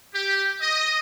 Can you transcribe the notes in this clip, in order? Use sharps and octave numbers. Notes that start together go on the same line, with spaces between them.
G4
D#5